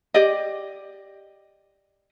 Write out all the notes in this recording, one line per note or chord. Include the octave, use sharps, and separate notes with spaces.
G4 D5 D#5